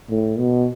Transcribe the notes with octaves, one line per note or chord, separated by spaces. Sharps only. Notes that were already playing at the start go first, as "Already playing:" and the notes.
A2
B2